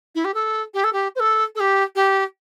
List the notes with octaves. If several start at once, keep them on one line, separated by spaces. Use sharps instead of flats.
E4
G4
A4
G4
A4
G4
C5
A4
A4
G4
G4